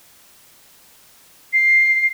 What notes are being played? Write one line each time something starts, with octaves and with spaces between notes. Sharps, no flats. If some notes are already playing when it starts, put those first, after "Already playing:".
C7